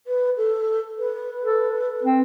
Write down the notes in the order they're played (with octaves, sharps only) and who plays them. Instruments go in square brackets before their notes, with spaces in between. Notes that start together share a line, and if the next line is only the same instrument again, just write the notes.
[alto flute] B4
A4
B4
[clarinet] A4
C4